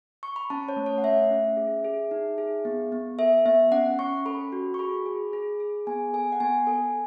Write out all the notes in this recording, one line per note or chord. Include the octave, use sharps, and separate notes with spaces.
C#6
B5
C#4 A5
C#5
A3
C#5
F#5
A3 E5
C#4
G#4
G#4
D#4
G#4
B3
B3
A4 E5
B3 E5
C#4 F#5
C#4 C#6
A4 B5
F#4
C#6
G#4 B5
G#4
G#4
G#4
B3 G#5
A4 G#5
F#5
B3 G#5
A4